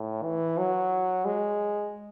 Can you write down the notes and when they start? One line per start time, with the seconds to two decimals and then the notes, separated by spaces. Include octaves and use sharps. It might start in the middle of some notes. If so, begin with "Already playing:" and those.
Already playing: A2
0.23 E3
0.58 F#3
1.26 G#3